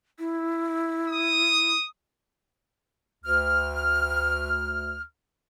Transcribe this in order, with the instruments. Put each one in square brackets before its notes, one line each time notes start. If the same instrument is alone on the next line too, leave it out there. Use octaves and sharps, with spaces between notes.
[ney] E4
[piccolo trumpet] D#6
[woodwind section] D2 F6